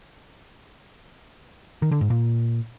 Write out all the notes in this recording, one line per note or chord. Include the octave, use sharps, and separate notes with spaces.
D#3
D3
G#2
A#2